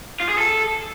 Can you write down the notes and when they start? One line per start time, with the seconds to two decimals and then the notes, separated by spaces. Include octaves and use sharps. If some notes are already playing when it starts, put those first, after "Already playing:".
0.20 F4
0.29 G#4
0.38 A4